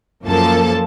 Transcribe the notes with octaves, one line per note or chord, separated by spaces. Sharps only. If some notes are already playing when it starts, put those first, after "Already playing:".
F#2 F3 A#3 A4 A5